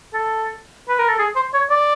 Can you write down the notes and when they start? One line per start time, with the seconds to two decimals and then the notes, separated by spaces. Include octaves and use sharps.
0.14 A4
0.89 B4
0.99 A#4
1.09 A4
1.19 G#4
1.36 C5
1.54 C#5
1.70 D5